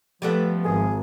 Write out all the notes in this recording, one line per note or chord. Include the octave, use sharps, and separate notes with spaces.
F3 G3 A3 B3
G#1 G#4